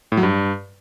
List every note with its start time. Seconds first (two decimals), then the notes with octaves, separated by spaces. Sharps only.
0.12 A2
0.17 F#3
0.23 G2